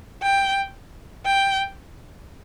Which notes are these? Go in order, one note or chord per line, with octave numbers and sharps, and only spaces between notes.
G5
G5